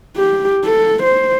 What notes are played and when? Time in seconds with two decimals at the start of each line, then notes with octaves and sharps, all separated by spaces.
0.17 G4
0.65 A4
1.03 C5